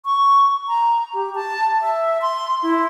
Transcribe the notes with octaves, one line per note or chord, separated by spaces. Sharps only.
C#6
A#5
G4
A5
E5
C6
E4